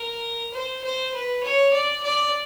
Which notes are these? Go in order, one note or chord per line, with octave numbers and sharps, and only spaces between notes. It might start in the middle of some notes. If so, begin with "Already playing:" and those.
Already playing: A#4
C5
C5
B4
C#5
D5
D5